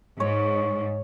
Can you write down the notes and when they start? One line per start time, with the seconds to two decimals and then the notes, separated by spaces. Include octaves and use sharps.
0.20 G#2 C#5